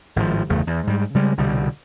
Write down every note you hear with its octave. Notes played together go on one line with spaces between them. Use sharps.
G#1 A2 D#3 F3
G1 E2 C#3 A3
E2
G#2 G3
C#3 G3 G#3
C2 B2 D3 G3